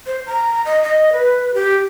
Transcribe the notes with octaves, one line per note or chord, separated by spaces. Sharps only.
C5
A#5
D#5
D#5
B4
G4